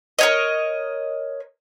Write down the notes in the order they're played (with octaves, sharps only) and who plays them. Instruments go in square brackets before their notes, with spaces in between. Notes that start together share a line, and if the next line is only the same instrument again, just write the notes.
[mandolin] A#4 C#5 D#5